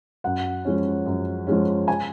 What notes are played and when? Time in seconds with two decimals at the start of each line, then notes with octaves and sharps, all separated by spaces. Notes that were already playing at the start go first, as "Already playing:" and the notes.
0.24 F#2 F#5
0.65 F3 G#3 C#4
1.06 F#2
1.47 F3 G#3 C#4
1.88 G#5